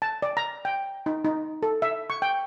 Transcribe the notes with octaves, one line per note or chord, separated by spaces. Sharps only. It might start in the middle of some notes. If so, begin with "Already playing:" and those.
A5
D5
A#5
G5
D#4
D#4
A4
E5
C#6
G5